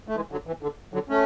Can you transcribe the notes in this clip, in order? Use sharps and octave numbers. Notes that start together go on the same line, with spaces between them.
A3
E3 G#3
D3 F#3
E3
D3
D3 F#3
A3 C#4